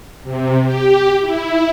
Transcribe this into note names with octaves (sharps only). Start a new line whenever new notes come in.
C3
G4
E4